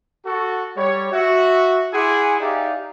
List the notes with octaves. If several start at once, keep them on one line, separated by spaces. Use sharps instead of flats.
F#4 A4
G3 C#5
F#4 E5
E4 G#4 F#5 G#5 C6 D6
D#4 G4 G#4 D5 E5 F5